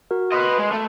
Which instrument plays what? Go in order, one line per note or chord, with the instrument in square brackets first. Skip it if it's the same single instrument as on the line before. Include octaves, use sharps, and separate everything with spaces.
[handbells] F#4 A#4
[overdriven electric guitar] B4 D#5 [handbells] C6
[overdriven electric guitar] G#3
A3